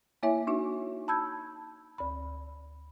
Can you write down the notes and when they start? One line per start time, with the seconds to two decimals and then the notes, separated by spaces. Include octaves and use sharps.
0.23 A#3 E4 C#5 E5 G#5
0.47 D4 D#4 F#4
1.08 A5 B5 E6 G6 G#6
1.98 D2 B5